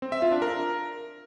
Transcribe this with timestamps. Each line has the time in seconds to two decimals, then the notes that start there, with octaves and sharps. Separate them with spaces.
0.02 C4
0.12 E5
0.22 F4
0.32 D4
0.42 A#4